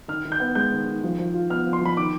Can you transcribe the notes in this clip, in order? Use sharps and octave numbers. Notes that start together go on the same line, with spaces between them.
D#3 F6
D#3
G6
B3
G#3 G6
D#3
D#3
F3
F3
F4
B3 F6
F3
C6
F3 B5
D#3 D6